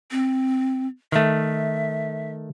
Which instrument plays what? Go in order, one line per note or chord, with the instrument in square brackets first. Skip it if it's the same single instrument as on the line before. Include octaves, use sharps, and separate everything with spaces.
[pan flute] C4
[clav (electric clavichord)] D#3 A3 [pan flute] E5